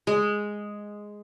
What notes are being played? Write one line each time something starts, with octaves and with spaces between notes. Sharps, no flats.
G#3